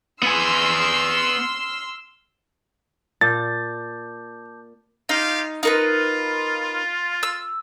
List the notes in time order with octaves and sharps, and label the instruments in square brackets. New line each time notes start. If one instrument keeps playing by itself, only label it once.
[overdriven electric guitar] B3 G#5 [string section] C6 E6 F6
[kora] A#2 [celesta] A5 D6 G6 [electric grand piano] A6
[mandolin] D#4 [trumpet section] F4 G4 F5
[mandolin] D#4 A#4 B4 [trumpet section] F4
[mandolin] E6